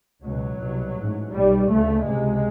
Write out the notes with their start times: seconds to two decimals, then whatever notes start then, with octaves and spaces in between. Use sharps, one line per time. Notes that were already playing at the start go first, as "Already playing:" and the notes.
0.23 C#2 B2 F#3
0.59 C2 B2
0.96 A1 G#2
1.32 B1 B2 G3
1.68 D2 C#3 A3
2.04 C#2 C3 G#3